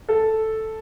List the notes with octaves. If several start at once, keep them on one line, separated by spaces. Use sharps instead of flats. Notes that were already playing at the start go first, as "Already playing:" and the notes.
A4